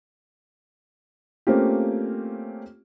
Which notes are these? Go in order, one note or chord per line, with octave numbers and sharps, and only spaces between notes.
A3 A#3 C4 C#4 F4 G4